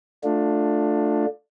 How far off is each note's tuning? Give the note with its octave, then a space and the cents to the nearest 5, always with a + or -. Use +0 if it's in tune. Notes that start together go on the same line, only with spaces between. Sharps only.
A3 +0 D4 +10 F4 +25